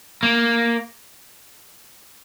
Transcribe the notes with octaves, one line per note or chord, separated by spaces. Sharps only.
A#3